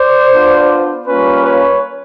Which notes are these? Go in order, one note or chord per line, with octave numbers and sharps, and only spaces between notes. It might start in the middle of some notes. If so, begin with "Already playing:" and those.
Already playing: C5 D5
B3 D4 F4
G3 A#3 C#4 F4 B4 C#5
B4 C#5